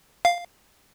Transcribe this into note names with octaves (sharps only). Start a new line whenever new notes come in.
F5